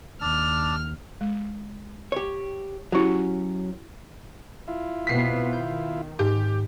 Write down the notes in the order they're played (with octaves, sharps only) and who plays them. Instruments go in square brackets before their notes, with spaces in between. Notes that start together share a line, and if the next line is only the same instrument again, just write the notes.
[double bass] D#2 [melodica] D4 A5 E6 [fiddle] F6
[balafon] G#3
[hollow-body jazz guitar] G4 C#5
[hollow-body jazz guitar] F#3 C#4 [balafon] E4 F#4 G4
[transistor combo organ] E4 F4
[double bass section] B2 B3 C4 [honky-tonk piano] B6 C7
[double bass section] D#3 [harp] G6
[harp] G#2 [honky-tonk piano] G4